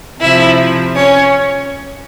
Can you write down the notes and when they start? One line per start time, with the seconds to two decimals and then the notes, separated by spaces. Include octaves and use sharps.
0.21 C3 F3 E4 E5
0.95 C#4 C#5